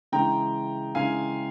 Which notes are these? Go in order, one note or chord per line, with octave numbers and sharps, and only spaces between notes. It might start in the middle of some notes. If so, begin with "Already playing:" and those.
C#3 E3 G#3 G5 A#5
C#3 E3 G#3 F5 G#5